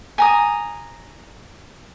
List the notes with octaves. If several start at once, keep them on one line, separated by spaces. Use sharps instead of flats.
G#5 A#5 D#6